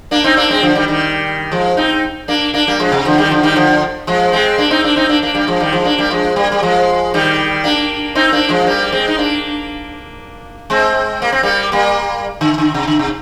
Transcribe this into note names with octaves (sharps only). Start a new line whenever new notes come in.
A#3 D4
C4 D#4
A#3 D4
G#3 C4
D3 F3
D#3 G3
D#3 G3
F3 G#3
C4 D#4
A#3 D4
A#3 D4
G3 A#3
F3 G#3
C3
D3 F3
D#3 G3
D3 F3
D#3 G3
D3 F3
F3 G#3
G#3 C4
A#3 D4
C4 D#4
A#3 D4
C4 D#4
A#3 D4
A#3 D4
G3 A#3
F3 G#3
D#3 G3
F3 G#3
A#3 D4
G3 A#3
F3 G#3
G3 A#3
G3
F3 G#3
D#3 G3
A#3 D4
C4 D#4
A#3 D4
F3 G#3
G3 A#3
G#3 C4
D#4
A#3 D4
G#3 C4
A#3
C4
G3 A#3
G3 A#3
D3
D3
C3
D3
C3